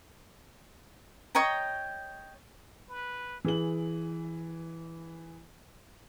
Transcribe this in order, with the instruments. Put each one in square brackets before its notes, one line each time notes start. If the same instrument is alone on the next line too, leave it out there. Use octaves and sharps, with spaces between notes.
[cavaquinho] C#5 D#5 G5 A#5
[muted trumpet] B4
[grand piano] E3 G#4 F#7